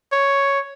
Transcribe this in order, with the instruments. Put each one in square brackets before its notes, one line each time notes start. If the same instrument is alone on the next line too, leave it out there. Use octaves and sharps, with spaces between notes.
[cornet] C#5